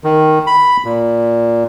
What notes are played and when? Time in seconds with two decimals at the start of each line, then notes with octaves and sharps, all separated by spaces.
0.04 D#3
0.47 B5
0.85 A#2